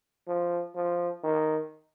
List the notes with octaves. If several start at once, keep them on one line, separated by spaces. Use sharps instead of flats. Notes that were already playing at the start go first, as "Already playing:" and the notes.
F3
F3
D#3